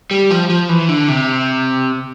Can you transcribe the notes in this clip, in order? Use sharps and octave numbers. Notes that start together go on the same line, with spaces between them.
G3
F3
F3
E3
D3
C3